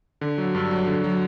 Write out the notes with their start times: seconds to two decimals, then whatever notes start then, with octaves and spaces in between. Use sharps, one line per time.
0.21 D3
0.38 F#3
0.55 G2
0.71 F#3
0.87 D3
1.04 F#3